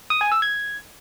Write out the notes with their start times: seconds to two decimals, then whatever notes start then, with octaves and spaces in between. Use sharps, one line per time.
0.10 D#6
0.21 G#5
0.32 E6
0.42 G#6